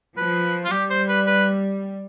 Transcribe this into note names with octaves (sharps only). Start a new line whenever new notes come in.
F3 B4
F4
G3 G4
C5
B4
B4